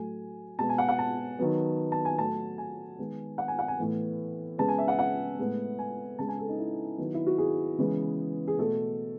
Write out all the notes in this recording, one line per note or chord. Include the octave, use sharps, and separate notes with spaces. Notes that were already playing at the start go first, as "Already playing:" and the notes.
Already playing: A2 F#3 A3 G#5
B2 G#3 B3 A5
G#5
F#5
F#5
A5
D#3 F#3 B3
A5
G#5
A2 F#3 A3 A5
G#5
D#3 G#3 B3
F#5
G#5
F#5
G#5
A2 E3 B3
C#3 G#3 B3 A5
G#5
E5
F#5
F#5
A2 G#3 B3
G#5
C#3 G#3 B3 A5
G#5
A4
D#4
E4
D#3 F#3 B3
E4
F#4
G#4
C#3 E3 G#3 B3
G#4
B2 A3 A4